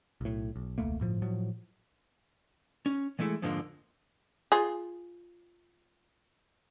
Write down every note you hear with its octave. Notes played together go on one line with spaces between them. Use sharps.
B1 A2
B1
E1 C#2 A3 A#3
G1 A2 F3
A2 F3 F#3
C#4
E3 G#3 A3 E4
F2 G#2 D3 F3 G#3 A#3
F4 G#4